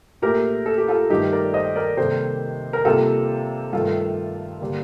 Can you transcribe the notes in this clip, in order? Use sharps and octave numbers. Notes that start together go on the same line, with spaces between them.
A#2 A3 G4 A#4
A4
G4
F4 A4
G2 D#3 A3 D#4 G4
A#4 D5
C5 D#5
A#4 D5
C3 D#3 G3 A#3 A4 C5
A#4
C3 G3 A#3 F4 A4
G2 D#3 A3 F4 A4
D3 G3 A#3